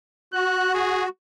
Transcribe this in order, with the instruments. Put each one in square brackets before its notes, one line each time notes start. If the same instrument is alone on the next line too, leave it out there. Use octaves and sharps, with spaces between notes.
[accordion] F#4 [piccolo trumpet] F#6
[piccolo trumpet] G#4